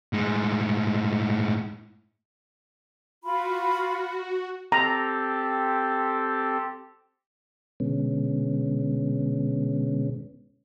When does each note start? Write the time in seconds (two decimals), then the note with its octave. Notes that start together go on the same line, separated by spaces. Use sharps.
0.13 A2 G#3
3.24 F4 F#4 B5
4.72 C4 G4 A4 A#5
7.80 B2 D3 G#3 B3 C#4